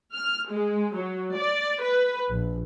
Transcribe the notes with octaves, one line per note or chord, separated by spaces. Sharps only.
F6
G#3
F#3
D5
B4
A#1